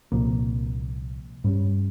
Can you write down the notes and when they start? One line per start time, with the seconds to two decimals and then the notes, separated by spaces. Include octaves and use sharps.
0.12 C2 A#2 F3 A#3
1.44 G2 G3 C#4